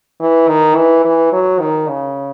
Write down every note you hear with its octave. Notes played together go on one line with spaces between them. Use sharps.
E3
D#3
E3
E3
F#3
D#3
C#3